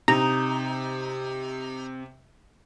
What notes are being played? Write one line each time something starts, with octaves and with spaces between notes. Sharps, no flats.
C3 D#4 A#5